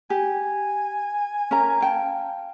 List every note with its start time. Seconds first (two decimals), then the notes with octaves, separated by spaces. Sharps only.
0.10 G4 G#5
1.51 C#4 A#4 A#5
1.81 F5 G5 A5